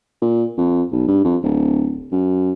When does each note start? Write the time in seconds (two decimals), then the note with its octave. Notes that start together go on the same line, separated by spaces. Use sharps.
0.22 A#2
0.58 F2
0.92 B1
1.08 G2
1.25 F2
1.43 D1
2.12 F#2